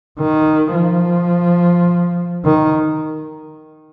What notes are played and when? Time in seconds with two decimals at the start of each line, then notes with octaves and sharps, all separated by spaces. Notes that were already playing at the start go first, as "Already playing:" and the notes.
0.19 D#3
0.75 F3
2.45 D#3